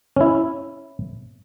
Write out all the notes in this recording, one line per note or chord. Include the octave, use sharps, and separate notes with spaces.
C#4 E4